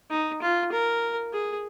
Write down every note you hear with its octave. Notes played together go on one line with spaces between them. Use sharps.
D#4
F4
A#4
G#4